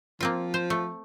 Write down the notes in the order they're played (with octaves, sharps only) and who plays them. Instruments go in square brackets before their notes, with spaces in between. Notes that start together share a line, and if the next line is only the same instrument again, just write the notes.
[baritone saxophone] F3 [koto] A#3 C4 F4
[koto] C5
A3